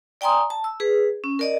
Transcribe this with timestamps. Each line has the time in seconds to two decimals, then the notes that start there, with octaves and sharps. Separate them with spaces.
0.21 D5 G5 G#5 A#5 C6 D#6
0.50 A5
0.64 E6
0.80 G#4 B4
1.24 C#4
1.39 A#4 D5 D#5